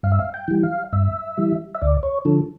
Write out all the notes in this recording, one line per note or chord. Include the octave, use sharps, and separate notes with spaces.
G2 F5
E5
F5
G5
E3 G3
F5
G2 E5
E3 G3
E5
D2 D5
C#5
D3 F3 A4